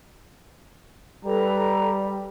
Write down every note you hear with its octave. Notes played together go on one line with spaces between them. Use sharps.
G3 A4 B4 A#5